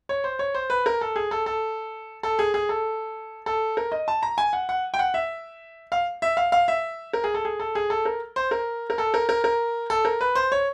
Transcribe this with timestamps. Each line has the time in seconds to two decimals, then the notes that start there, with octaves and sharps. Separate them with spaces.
0.09 C#5
0.24 C5
0.39 C#5
0.55 C5
0.70 B4
0.86 A#4
1.01 A4
1.16 G#4
1.31 A4
1.46 A4
2.23 A4
2.39 G#4
2.54 G#4
2.69 A4
3.46 A4
3.77 A#4
3.92 D#5
4.08 A5
4.23 A#5
4.38 G#5
4.53 F#5
4.69 F#5
4.94 G5
4.99 F#5
5.14 E5
5.92 F5
6.22 E5
6.37 F5
6.52 F5
6.68 E5
7.13 A#4
7.24 G#4
7.34 A4
7.45 G#4
7.60 A4
7.75 G#4
7.90 A4
8.05 A#4
8.36 C5
8.51 A#4
8.90 A#4
8.98 A4
9.14 A#4
9.29 A#4
9.44 A#4
9.90 A4
10.05 A#4
10.21 B4
10.35 C5
10.52 C#5